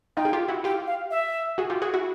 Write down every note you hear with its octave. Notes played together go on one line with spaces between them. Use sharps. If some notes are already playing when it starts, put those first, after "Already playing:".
D#4 F4 G5
G#4
F4 G4
E4 F#4
F4 G4 G5
F5
E5
F#4 G#4
F4 G4
F#4 G#4
E4 F#4